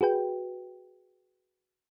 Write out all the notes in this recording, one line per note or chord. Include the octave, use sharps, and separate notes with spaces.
F#4 G#4 B4 G5